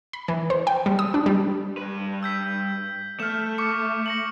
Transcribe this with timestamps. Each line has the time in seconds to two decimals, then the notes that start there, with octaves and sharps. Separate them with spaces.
0.13 B5
0.28 E3
0.50 C5
0.67 G5
0.86 G3
0.99 D#6
1.14 D4
1.26 G3
1.77 G2 B4
2.23 E6 G6 B6
3.20 A3 F6 E7
3.58 C#6 D6 C#7
4.06 A#6 C#7 F#7